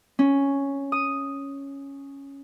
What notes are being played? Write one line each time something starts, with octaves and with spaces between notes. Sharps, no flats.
C#4
D#6